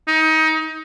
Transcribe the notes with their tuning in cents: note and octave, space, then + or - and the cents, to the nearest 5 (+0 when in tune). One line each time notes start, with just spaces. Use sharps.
D#4 +25